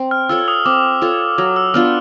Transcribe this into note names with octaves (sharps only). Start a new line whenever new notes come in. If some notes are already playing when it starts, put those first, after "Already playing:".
Already playing: C4
F6
F4 A4 C#5 E6
D#6
C4 D6
F4 A4 C#5
F#3 D#6
E6
B3 D4 F4 F6